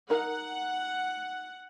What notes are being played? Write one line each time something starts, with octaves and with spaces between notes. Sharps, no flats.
D#4 A#4 F#5